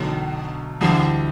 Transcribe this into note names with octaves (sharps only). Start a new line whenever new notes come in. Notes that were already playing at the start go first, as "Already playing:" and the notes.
Already playing: B1 B2 D3 F#3 A3
D2 D3 E3 G3 E4